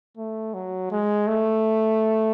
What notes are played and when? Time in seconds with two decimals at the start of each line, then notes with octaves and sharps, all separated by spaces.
0.17 A3
0.54 F#3
0.91 G#3
1.27 A3